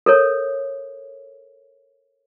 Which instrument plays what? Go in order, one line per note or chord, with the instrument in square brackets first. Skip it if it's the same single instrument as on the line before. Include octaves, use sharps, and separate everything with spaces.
[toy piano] A4 A#4 C#5